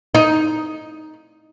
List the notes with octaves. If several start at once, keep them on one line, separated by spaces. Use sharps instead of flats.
D#4